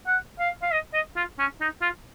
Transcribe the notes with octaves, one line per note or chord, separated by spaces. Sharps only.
F#5
F5
F5
D#5
D#5
F4
C#4
D#4
F4